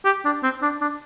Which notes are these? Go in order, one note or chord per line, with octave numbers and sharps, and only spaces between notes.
G4
D4
C4
D4
D4